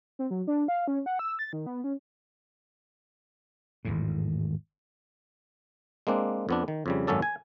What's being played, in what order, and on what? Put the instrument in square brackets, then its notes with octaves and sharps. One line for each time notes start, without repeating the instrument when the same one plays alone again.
[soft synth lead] C4
F#3
D4
F5
C#4
F#5
E6
A6
D#3
B3
C#4
[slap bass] G#1 E2 A2
[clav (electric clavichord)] G#3 A#3 C4 D4
F2 B3 D4
D#3
F2 C#3 G3
G#1 F#2 F#3 C#4 A4 D5
G#5